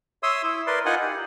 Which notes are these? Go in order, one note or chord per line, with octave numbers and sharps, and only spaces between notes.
C#5 E5 C6 D#6 E6
E4
A#4 B4 D5 C6
D#4 F4 A#4 F#5 G#5
G4